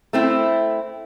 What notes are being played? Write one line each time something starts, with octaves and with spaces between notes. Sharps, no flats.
A3 C4 E4